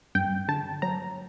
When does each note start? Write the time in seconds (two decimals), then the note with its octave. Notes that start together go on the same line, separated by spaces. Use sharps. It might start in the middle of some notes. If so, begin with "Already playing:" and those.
0.15 G2 G5
0.48 D3 A5
0.82 F#3 A#5